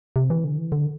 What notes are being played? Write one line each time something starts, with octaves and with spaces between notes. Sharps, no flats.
C3
E3
D3
E3
D3